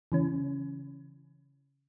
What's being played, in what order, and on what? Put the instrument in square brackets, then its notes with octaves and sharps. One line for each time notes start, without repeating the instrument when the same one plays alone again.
[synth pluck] C#3 E3 C#4